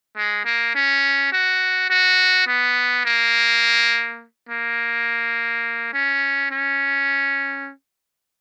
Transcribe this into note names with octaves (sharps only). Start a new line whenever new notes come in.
G#3
A#3
C#4
F#4
F#4
B3
A#3
A#3
C#4
C#4